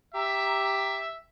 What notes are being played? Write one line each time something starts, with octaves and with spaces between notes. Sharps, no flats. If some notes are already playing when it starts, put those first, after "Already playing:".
G4 E5 A#5